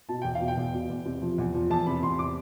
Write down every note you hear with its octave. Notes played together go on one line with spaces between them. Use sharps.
B2 A5
E2 G5
F5
B2
G5
E2
B2
E2
C3
F3
E2
F3
E2 A5
C3 B5
E2 C6
C3 D6